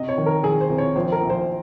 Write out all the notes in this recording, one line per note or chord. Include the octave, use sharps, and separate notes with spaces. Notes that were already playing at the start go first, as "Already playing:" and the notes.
Already playing: C3 D#5
C#5
D#3
A#4
D#3 G#4
C5
C2
C#5
A#1 C5
A#4
A#1
C5